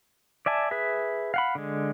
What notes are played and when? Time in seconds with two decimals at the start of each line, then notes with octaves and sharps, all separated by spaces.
0.46 D5 E5 G#5 A5
0.71 G#4 B4 E5
1.34 F5 F#5 B5
1.55 D3 G#3